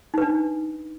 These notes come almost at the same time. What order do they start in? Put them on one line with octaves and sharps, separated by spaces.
D#4 B4 D4